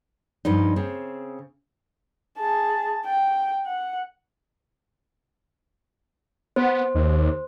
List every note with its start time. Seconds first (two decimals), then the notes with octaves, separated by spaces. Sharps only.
0.45 G2 F3 D#4
0.76 C#3 C4
2.38 G#4 A5
3.06 G5
3.66 F#5
6.56 B3 C5
6.95 D#2